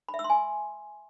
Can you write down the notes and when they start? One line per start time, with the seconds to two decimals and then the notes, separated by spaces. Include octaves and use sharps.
0.09 B5
0.14 E5
0.19 E6
0.24 C6
0.30 G#5